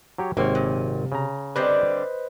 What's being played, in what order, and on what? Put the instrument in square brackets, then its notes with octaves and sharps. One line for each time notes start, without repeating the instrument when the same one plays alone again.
[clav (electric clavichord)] F#3 G4 C#5
[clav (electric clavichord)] G#1 C4 C#5 [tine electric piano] C3 [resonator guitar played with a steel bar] A#3
[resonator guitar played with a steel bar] A#2
[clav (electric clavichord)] C#3 A#5
[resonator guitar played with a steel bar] D3 G3 C4 [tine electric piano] B4 C5 D#5